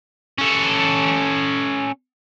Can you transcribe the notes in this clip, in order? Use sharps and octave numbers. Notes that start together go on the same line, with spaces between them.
C#4 A4